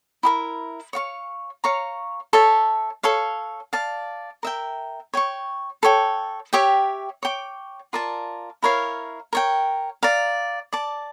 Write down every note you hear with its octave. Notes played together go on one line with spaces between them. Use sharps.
E4 G4 A#4
C#5 F5 C#6
C#5 F5 A#5 C#6
A4 C#5 E5 A5
A4 C#5 F5
D5 F5 A5
A#4 E5 G5
C#5 G5 C#6
A4 C#5 G5
G4 C#5 E5 G5
C#5 G5 D6
F4 A#4 D5 A5
E4 A#4 C#5 F5
A#4 C#5 G5
D5 F5 A#5
D5 A5 D6